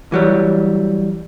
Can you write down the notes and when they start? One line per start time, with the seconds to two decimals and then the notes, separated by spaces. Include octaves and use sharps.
0.12 E3 F#3 G3